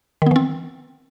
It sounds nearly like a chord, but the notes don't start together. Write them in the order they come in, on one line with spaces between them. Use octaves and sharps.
D#3 B3 E3 C4